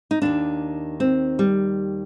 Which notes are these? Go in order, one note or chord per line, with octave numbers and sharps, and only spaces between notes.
D#4
D#2 D#3 D4
C4
G3